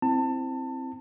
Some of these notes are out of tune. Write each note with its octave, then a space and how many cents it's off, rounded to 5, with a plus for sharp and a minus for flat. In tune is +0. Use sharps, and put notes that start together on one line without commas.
C4 +0 E4 +0 A5 +25